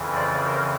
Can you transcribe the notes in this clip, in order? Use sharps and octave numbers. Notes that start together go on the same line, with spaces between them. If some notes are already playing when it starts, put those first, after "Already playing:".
Already playing: F2 C#3 E3
C5 D5
A#4 C5